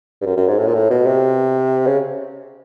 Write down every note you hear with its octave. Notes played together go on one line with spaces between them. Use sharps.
G2
F#2
F#2
G#2
A2
A#2
A2
B2
C3
C#3